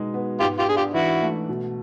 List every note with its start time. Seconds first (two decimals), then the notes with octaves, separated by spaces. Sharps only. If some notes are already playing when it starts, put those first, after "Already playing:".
Already playing: B2 G#3 D#4
0.14 B3
0.40 G#2 F4 G4
0.59 F4 G4
0.68 D4 G#4
0.76 F4 G4
0.94 E3 E4 F#4
1.22 A3
1.49 B2